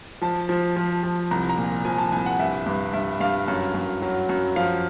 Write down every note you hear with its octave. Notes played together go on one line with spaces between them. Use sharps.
F3 A5
F3
F3
F3
C2 A#5
A#5
A#2
F3 G#5
A5
C2 G#5
F#5
G2 E5
G2
G2 E5
G2 F5
F#2
F#2
F#3
F#2
F3 F5